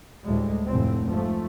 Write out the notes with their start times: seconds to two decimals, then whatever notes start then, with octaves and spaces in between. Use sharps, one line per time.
0.25 D2 A2 G3 G#3
0.67 F1 A2 C4
1.09 G#2 F3 A3